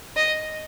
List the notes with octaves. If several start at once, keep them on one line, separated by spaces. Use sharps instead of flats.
D#5